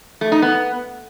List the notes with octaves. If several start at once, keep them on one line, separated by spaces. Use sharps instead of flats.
A3
D#4
B3